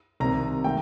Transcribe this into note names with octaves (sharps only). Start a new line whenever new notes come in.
C2 C3 D#3 A#5
D#3 A3 G5